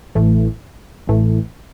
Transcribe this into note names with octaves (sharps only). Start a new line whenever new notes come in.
A1 A2 E3 A3
A1 A2 E3 A3